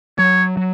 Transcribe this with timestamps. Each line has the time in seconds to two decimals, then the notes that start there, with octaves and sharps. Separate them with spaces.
0.18 F#3 C#5
0.57 F#3